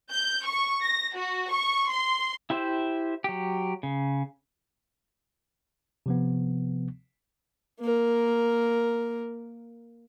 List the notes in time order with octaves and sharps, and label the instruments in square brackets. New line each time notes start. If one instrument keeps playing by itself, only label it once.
[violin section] G6
C#6
A#6
F#4
C#6
C6
[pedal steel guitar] E4 G4 C5 E5
F#3 G4
C#3
[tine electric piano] C3 F3 B3
[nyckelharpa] A#3 A#4